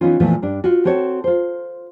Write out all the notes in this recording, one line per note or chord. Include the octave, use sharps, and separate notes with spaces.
E3 B3 C#4 D#4 F4
A#2 E3 F3 A3 B3
G2 D4
F4 F#4
C4 F#4 A4 C#5
F4 C5